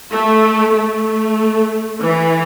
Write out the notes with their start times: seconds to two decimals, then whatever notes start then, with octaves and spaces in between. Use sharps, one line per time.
0.11 A3
0.74 A3
2.01 E3